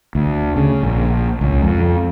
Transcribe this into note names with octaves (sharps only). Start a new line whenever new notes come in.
D2
C#3
A#1
C#2
F2